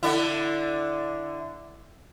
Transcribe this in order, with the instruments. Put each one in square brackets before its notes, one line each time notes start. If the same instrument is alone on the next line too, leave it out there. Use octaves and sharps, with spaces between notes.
[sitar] D3 D4 E4